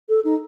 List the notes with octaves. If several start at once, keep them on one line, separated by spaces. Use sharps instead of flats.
A4
D#4